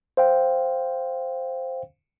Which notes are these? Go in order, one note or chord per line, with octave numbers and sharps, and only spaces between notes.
C5 F5 G5